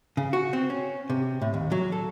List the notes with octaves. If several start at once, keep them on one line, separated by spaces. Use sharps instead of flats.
C#3
F#4
C4
C#4
C3
A2
D#2
F#3
A4